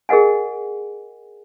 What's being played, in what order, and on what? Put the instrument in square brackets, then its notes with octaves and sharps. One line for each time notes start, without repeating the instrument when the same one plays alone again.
[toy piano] G#4 A#4 D#5 F#5 G#5